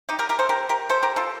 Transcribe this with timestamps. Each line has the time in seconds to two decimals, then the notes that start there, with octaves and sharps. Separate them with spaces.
0.09 D#4 G4
0.19 G4 A#4
0.29 G4 A#4
0.39 A4 C5
0.49 G4 A#4
0.69 G4 A#4
0.89 A4 C5
1.03 G4 A#4
1.16 F4 A4